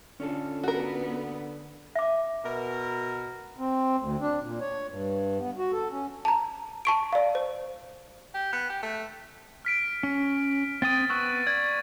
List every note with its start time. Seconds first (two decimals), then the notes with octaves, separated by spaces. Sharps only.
0.20 D3 C#4 F4 A4
0.63 B3 F#4 A#4
1.96 E5 D6
2.44 B2 A#4
3.59 C4
4.00 D2
4.21 D4
4.42 A#2
4.61 C#5
4.89 G2
5.39 B3
5.58 F#4
5.72 A4
5.91 C#4
6.25 A5 A#5
6.85 A5 C#6 D7
7.13 D5 F5
7.35 C5
8.34 G4
8.53 B3
8.70 G4
8.82 A3
9.65 F6 B6 D7
10.03 C#4
10.82 C4 G5 D#6 A6 D#7
11.10 B3 C#6 E6 F#6
11.47 D5 G#6